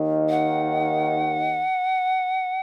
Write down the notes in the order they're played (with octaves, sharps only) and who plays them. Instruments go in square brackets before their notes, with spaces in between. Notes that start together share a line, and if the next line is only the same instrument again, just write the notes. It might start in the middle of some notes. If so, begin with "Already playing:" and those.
Already playing: [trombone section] D#2 D#3
[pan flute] F#5